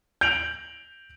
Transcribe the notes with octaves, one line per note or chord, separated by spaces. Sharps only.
G6 D7 F7 F#7